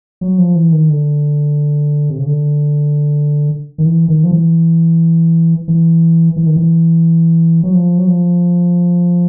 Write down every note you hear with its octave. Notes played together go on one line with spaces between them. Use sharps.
F#3
F3
E3
D#3
D3
C3
C#3
D3
D#3
E3
D#3
F3
E3
E3
E3
D#3
E3
F#3
F3
F#3
F3